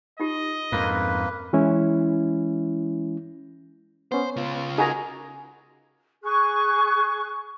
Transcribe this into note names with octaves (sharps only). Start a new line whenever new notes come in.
D#4 F4 G4 D#5
F2 G#2 A#3 B4
E3 G#3 C#4 E4
B3 C#4 C5
C#3 F4
D#4 F#4 G#4 A#4 G#5 A#5
G#4 C#6 F#6